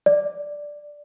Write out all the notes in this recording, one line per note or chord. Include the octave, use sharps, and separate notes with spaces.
D5